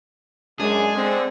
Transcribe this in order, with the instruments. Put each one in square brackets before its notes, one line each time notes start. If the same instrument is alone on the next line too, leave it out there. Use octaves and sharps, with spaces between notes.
[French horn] F#2 [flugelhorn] G#3 [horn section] D4 [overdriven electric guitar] G#4
[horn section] D3 [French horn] C4